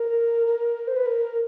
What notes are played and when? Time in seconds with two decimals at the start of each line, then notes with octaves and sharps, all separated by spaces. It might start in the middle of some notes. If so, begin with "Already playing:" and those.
Already playing: A#4
0.47 A#4
0.88 C5
0.96 B4
1.06 A#4